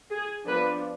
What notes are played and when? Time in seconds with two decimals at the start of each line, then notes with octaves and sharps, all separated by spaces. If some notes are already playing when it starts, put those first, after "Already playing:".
0.11 G#4
0.47 F3 B3 D4 B4